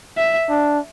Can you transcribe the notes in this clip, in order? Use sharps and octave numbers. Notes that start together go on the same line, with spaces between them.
E5
D4